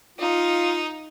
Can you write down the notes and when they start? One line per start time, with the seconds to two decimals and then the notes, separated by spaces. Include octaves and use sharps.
0.18 D#4 F4